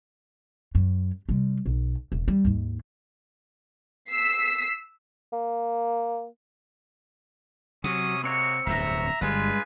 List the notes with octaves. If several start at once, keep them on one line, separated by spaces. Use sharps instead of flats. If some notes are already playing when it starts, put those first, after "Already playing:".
F#2
C3 G3
B1
E1
G3
D#2 G#2
E6 B6 C7
A#3
C3 F#3 C#4 C#6 D#6
G#3 A#3 C4 F#4 C#5
D1 E2 G2 E5 A#5
G1 G2 G3 G#3 F4 B4 G#5